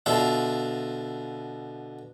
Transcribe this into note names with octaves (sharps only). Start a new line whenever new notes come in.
B2 D3 F4 E5